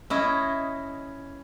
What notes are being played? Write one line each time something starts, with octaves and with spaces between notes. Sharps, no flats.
C#4 E4 D#5